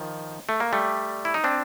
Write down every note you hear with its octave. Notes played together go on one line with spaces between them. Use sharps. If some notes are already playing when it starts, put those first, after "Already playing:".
Already playing: D#3 F3
A3
A#3
G3 A3
E4
D#4
C4 D4